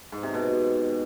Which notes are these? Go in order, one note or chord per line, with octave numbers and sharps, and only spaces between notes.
G#2
C3
B2